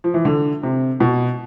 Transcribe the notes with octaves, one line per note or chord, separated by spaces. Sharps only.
F3
E3
D3
C3
B2